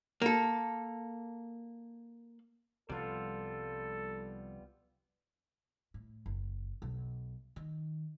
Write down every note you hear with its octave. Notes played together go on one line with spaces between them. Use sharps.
A#3 A4
C2 F3 G3 B3 F4 A4
A2
F#1
B1
D#3